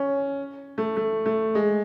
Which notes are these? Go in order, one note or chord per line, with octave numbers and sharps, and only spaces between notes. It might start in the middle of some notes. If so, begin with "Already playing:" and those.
Already playing: C#4
A3
A3
A3
G#3